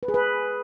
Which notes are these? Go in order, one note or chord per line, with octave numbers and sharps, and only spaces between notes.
B4
G#4
B4